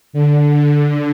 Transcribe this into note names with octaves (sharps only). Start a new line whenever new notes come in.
D3